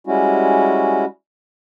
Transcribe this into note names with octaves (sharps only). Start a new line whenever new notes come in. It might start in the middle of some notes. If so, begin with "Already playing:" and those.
G3 G#3 C#4 E4 F#4